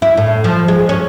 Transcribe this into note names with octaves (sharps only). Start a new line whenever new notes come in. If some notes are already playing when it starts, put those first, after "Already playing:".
E4
A2
F3
G#3
C#4